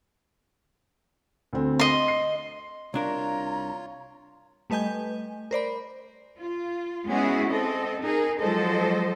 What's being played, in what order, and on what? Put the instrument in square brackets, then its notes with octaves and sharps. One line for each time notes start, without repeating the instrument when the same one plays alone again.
[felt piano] D2 C4
[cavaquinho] D#5 C6
[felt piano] C7
[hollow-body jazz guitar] C2 D4 A#4 [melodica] F4 C#5 [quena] A#5
[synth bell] G3 A3 B4 D#5 G#5 G6
A#4 C5 D5 B5
[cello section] F4
G#3 B3 C#4 E4 F#4 G#4
C4 A4 D#5
D#4 G#4 A#4
F3 F#3 G#3 A4 C5 D#5